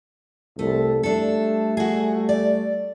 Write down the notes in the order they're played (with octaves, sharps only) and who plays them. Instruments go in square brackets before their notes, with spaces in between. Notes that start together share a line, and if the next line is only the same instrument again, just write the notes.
[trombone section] C2 A4 [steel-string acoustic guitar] A3
[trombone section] G3 A3 [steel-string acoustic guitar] D4 A4
[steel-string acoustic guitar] F#4 G#4
D5